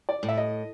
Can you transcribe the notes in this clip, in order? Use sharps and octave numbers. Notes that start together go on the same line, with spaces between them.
D5
A2
E5
D#5